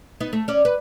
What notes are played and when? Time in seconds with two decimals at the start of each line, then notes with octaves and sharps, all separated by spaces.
0.20 B3 D#4
0.33 A3
0.48 C#4 D5
0.65 B4